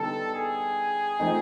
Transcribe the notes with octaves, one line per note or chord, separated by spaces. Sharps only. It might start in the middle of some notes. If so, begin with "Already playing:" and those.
Already playing: D3 G3 B3 D#4 A4
G#4
F3 A3 C4 D#4